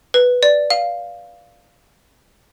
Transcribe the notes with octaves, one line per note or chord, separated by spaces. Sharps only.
B4
D5
F5